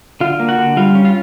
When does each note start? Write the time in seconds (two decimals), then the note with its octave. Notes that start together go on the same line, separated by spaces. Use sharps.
0.21 D3 F4 F5
0.40 A#3
0.49 F#4 F#5
0.58 D3
0.77 G3 F4 F5
0.95 C#4
1.05 F4 F5